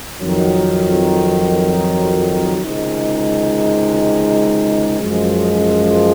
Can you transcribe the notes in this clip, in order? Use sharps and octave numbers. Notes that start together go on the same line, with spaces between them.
F2 D#3 F#3
C#2 C3 D#3 G#3 D#4
F#2 F3 G#3